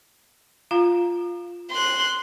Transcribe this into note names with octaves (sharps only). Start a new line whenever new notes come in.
F4 F5 A#5
C6 F#6